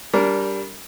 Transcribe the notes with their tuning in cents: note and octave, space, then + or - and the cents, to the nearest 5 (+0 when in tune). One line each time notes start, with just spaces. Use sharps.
G3 +0 D4 -25 A#4 +0